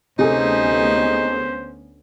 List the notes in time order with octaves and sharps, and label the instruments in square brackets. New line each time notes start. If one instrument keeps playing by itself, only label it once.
[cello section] D2 B3 C#4 [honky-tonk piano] C3 G#4 A4 [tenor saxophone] D#4 [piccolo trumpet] C5